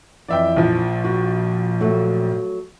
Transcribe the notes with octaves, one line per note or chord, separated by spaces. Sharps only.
F2 E3 D5 E5 G5
A#1 A#2 F3
F#4
F#3 A3 F#4